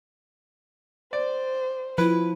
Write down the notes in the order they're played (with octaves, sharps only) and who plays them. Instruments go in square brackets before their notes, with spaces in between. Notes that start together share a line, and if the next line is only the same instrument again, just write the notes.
[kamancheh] C5 [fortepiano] D5
[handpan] F3 [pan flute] E4 [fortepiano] B4